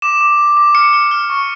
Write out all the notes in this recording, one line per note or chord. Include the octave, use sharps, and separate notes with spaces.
D6 E7
D6
D6
D6
F6 C#7
F6
F6
C#6